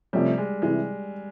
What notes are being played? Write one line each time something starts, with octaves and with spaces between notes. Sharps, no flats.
C3 F3 G3 A3 C#4
G#3
C3 E3 G#3